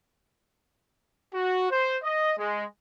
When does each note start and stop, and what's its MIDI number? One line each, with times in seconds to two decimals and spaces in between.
1.34 1.70 66
1.71 1.97 72
2.03 2.33 75
2.38 2.65 56